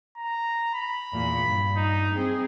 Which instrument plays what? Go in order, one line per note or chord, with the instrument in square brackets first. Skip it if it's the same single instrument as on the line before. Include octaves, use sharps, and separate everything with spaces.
[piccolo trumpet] A#5
B5
[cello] E2 A#2
G2
[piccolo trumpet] D#4
[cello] C4 G#4